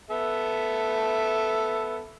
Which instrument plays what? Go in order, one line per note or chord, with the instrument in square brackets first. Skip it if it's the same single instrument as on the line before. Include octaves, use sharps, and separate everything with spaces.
[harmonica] B3 A4 E5